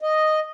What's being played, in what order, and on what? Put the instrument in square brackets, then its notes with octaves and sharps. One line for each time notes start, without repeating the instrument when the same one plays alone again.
[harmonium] D#5